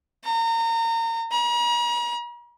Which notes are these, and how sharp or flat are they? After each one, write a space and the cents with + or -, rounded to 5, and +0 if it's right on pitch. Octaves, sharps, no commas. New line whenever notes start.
A#5 -30
A#5 +45